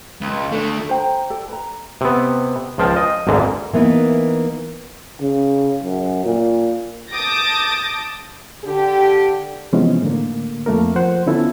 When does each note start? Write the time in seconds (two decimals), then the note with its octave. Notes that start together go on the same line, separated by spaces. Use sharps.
0.21 C#2
0.52 D3 A3
0.89 C5 G5 A#5
1.30 A4 D5 G5
1.48 B4 A#5
2.01 C3 B3
2.78 C#2 F3 F5 G5 A5
2.96 D#5
3.27 G#1 D2 G#2 D3 A#5
3.73 E3 A#3 B3 D#4 B4
5.22 C#3
5.83 F#2
6.25 A#2
7.11 A5 D6 D#6 G6 A6 A#6
8.64 D3 G4
9.73 C3 E3 F3 G#3 B3 C#4
10.02 A2 D3 A#3
10.66 F2 A3 A#3 A#4
10.96 F3 C5 F#5
11.27 D3 B3 C#4 E4 F4 A4